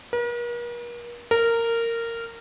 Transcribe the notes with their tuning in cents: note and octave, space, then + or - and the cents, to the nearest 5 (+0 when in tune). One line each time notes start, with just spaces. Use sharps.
A#4 +45
A#4 -15